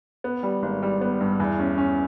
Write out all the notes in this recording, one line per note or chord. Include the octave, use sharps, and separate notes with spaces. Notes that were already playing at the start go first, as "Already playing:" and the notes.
B3
G3
G#1
G3
B3
G2
E2
C#4
C#4